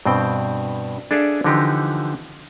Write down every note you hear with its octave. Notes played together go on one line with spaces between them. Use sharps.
G2 B2 C4 G5
D4 G#4 A4 D5 E5 F5
D3 E3 F3 D#4 G4